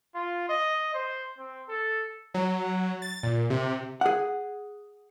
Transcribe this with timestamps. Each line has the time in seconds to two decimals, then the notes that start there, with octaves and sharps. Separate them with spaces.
0.15 F4
0.49 D#5
0.94 C5
1.38 C4
1.68 A4
2.34 F#3
3.02 A6
3.23 A#2
3.50 C3
4.01 G#4 F#5